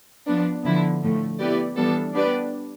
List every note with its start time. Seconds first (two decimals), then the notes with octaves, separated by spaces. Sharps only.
0.27 F3 B3 D4
0.65 D3 F3 B3 E4
1.03 A2 F3 A3
1.39 B3 E4 G4 B4 D5
1.76 E3 G3 B3 D4 A4
2.15 B3 D4 G4 B4 D5